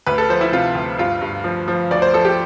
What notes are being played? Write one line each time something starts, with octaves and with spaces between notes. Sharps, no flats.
D2 B4
A4
F3 C5
E4
C3 F4
D2
G2 F4
G2
F3
F3
D2 D5
C5
F3 A4
G4